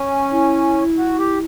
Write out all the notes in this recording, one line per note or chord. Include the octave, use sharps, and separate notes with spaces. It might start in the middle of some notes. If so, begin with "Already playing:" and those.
Already playing: C#4
E4
F#4
G4